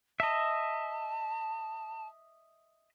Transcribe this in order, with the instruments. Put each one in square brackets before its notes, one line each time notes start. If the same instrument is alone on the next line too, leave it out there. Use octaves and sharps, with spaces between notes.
[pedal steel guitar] D#5 E5 [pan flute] A5